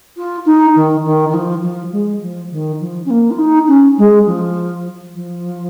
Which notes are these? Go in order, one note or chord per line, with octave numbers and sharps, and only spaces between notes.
F4
D#4
D#3
D#3
D#3
F3
F3
G#3
F3
D#3
F3
C#4
A#3
F4
D#4
C#4
G#3
F3
F3